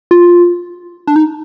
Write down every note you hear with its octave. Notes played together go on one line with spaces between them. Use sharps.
F4
D4
D#4